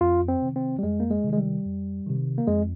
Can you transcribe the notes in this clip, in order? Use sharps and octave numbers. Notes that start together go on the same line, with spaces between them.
F2 F4
C4
C3 D#3
C4
G3
F2 G#3
A#3
G#3
C3 D#3
G#3
G3
F2
C3 D#3
A#3
F2 G#3